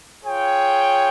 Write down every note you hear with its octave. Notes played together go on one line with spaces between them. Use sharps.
F4 G#4 C#5 G5